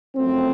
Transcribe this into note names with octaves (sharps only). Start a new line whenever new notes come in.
F#2 F3 A3 C4